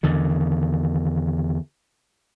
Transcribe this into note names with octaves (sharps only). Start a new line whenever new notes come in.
E2 D3 D#3